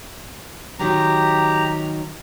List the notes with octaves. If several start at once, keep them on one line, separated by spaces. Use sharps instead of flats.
D#3 F#3 G4 A#5